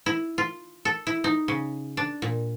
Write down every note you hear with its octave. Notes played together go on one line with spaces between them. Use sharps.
E4
F4
A4
E4
D#4
C#3
D4
A#2